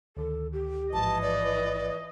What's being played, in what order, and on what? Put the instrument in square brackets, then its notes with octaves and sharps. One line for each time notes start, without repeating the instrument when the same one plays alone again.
[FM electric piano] D2 D#3 [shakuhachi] A4
[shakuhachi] G4
[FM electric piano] A1 G#2 F3 [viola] E3 D#5 [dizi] A5
[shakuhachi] B4 [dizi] D5